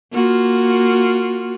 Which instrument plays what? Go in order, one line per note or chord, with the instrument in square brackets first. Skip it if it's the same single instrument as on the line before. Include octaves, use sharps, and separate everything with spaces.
[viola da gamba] A#3 F4 F#4